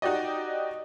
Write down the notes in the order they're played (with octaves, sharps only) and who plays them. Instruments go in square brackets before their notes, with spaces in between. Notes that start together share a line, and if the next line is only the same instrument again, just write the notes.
[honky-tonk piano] D#4 F#4 G4 D5 D#5